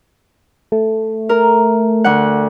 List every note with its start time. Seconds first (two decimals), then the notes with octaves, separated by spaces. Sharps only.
0.72 A3
1.29 A#4
2.04 D2 F#5